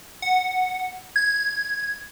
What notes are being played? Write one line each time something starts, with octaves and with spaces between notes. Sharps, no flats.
F#5
G#6